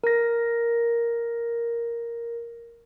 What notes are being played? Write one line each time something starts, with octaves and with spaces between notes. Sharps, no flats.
A#4 A#6